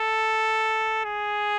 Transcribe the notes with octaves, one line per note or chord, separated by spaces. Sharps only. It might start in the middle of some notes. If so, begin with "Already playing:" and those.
Already playing: A4
G#4